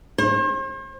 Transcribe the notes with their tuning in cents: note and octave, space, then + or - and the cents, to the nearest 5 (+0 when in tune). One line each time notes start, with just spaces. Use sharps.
C5 +45